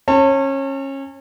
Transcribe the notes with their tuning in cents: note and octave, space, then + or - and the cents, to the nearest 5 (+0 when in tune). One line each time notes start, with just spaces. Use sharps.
C#4 -25 A5 +30